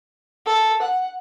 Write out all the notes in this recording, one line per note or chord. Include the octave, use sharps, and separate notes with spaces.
A4
F#5